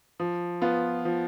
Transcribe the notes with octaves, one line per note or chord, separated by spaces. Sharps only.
F3
B3 F4
F3